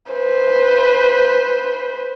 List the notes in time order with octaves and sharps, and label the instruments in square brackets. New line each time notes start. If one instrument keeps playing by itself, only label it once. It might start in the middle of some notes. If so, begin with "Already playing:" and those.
[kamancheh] B4 C5